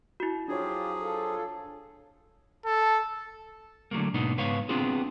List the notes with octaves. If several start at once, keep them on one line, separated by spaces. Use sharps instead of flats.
E4 F#4
F3 F#3 D4 F4 G4 G#4 C#5
F4 A4
A4
D3 F#3 A3 A#3
G#2 B2 A#3 B3 D4 D#4
C#2 G#2 B3 B4 C#5 F5
B3 C4 D4 F4 G#4